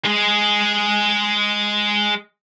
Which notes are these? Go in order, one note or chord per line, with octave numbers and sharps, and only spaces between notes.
G#3 G#4